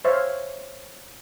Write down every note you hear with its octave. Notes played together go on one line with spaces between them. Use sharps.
C5 C#5 E5 F5